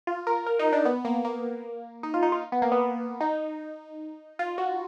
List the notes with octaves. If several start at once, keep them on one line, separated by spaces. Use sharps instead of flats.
F4
A#4
A#4
D#4
D4
B3
A#3
A#3
D#4
F4
D#4
F4
B3
A#3
B3
D#4
F4
F#4